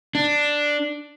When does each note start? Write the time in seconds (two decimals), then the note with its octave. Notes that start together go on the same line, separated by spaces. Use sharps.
0.15 D4